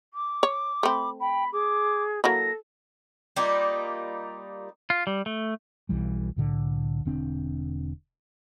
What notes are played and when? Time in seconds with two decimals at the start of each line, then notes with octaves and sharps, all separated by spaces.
0.14 D6
0.43 C#5
0.83 A3 C4 B5
1.20 G5 B5
1.53 G#4 D6
2.24 F#3 A#3 E4 A4 A#6
3.36 G3 A#3 D#4 F4
4.90 F4
5.07 G3
5.26 A3
5.89 B1 E3 G3
6.36 C2 A2 D3
7.05 E1 D3 C4 D4